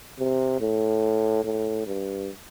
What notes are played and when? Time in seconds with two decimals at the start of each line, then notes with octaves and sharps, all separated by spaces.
0.19 C3
0.60 A2
1.44 A2
1.86 G2